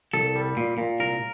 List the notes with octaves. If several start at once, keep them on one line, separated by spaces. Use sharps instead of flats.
C2 A4
G3
A#2
A#2
C2 A#4